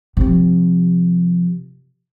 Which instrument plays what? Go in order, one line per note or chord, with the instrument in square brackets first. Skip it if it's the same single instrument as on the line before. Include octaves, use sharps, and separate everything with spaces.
[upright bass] C3 F3